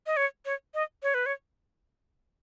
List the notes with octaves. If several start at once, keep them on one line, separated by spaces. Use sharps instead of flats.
D#5
C#5
C#5
D#5
C#5
B4
C#5